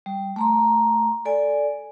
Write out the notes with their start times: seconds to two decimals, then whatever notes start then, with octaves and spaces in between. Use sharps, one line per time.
0.06 G3
0.36 A3 A#5 C6
1.25 A4 D5 G#5